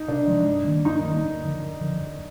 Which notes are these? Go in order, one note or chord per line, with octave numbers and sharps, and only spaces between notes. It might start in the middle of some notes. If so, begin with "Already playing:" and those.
Already playing: D#4
C3 D4
F3 G#3
G2
D#3 A#3
G2 D#4
D#3 A#3
F2
D3 F3
F2
D3 F3
F2